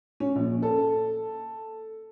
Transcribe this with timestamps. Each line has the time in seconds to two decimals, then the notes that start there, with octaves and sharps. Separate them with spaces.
0.20 C#4
0.36 A#1
0.63 A4